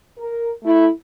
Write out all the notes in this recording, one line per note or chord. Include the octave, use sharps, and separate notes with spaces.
A#4
A3 E4